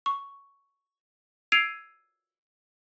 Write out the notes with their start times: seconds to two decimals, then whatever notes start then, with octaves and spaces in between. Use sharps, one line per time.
0.06 C#6
1.52 E6 G#6 C7 D7 D#7 F7